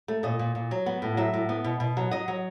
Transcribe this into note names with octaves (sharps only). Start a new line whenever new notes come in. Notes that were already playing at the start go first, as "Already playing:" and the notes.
A3
A#2 D#5
A#2
A#2
F#3
B3
A2
F#3 E5
A2
B3
B2
B2
F#3
F#3 D#5
F#3